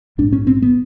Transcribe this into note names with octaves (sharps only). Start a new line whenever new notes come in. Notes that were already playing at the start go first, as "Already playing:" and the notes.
A#1 G#2 D4
C#4
C4
B3